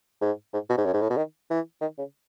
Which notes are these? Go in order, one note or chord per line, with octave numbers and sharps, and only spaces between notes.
G#2
G#2
B2
G#2
F#2
G#2
A2
B2
D#3
E3
D#3
C#3